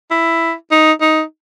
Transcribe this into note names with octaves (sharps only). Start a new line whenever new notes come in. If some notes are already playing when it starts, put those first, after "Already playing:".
E4
D#4
D#4